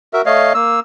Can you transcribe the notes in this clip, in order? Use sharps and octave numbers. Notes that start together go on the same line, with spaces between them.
F#4 A#4 E5
A3 C#5 D#5 F5
A#3 E6